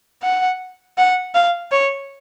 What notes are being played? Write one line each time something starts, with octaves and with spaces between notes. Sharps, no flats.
F#5
F#5
F5
C#5